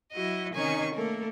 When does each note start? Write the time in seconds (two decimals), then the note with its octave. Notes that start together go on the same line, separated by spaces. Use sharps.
0.14 F#3 E4 F#4 D#5
0.54 C3 D#3 C#4 D#4 G#5 C#6
0.95 A3 A#3 A4 A#4